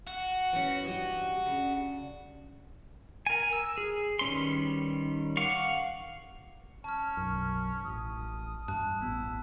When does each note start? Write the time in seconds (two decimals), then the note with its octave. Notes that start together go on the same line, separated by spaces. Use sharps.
0.07 F#4
0.53 E3 C#4
0.84 G2 G4 D#5
1.46 C#3 D4
3.26 A#4 G#5
3.53 E6
3.78 G#4
4.19 D#3 G3 C#4 B4 C6
5.37 F5 F#5 C#6 D6
6.84 C#4 A5 F6
7.17 B1 F#2
7.85 A1 D#6
8.68 G2 A5 F#6
9.01 A1 B3 E4